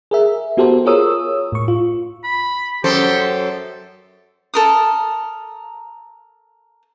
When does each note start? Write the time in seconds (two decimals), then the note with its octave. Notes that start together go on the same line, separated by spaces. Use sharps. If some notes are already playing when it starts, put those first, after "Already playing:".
0.11 G#4 A#4 E5
0.57 B3 F#4 G4 A4 A#4 C5
0.86 F4 G#4 A#4 C#5 D#6 E6
1.52 A2 C#6
1.68 F4
2.24 B5
2.84 F#2 G4 A4 C5
4.54 A4 A#4 D#6